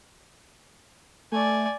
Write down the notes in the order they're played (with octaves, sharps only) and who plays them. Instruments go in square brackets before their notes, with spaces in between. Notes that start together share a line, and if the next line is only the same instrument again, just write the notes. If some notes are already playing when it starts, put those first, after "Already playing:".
[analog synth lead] A3 [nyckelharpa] D5 G#5